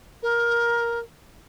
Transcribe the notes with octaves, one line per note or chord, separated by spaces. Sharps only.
A#4